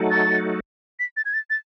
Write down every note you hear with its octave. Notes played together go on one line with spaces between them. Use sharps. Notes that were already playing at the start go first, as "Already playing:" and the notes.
Already playing: F#3 A3 D#4 F#4 A4
A6
B6
A6
G#6
A6
A6